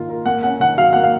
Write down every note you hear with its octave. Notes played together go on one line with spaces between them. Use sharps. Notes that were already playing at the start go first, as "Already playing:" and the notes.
Already playing: D#3 A#3 F4
A#4
A#3 F#5
C#4 F#5
D#3 F#5
F#3 F5
A#3 F#5
F5